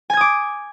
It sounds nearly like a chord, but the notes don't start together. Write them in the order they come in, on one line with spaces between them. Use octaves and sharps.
G#5 G#6 D#6 D6